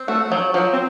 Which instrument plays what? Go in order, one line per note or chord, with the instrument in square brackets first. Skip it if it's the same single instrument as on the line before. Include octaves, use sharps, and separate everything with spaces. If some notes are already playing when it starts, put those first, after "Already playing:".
Already playing: [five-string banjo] C4
[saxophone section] A3 [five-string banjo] F#4
[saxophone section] F3 [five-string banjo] F#3
[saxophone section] F3 [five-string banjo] F#3
[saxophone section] C4